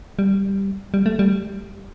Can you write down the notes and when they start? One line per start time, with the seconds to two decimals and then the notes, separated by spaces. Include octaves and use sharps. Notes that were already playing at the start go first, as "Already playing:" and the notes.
0.19 G3
0.94 G3
1.06 A3
1.19 G3